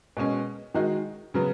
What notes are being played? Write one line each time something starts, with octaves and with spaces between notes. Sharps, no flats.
B2 G#3 C#4
D#3 G#3 D#4 F#4
C#3 F#3 B3